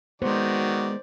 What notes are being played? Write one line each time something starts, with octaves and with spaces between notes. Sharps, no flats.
D#3 G#3 B3 F#4 C5 D5